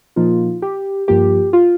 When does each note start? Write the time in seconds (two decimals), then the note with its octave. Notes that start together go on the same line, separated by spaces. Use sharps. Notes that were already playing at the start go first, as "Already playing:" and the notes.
0.16 A#2 F3 A#3 D#4 F4
0.62 G4
1.08 G2 F3 A#3 F4 G4
1.53 F4